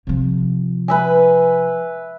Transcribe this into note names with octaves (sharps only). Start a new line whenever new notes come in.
C3 F3
B4 E5 G#5